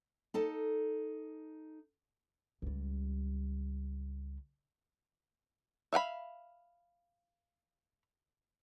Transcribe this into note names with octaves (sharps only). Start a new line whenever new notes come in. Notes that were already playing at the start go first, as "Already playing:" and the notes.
D#4 A4 A5
C#2 G3
E5 F5 G5 B5